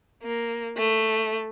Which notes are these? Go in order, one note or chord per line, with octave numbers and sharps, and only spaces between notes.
A#3
A3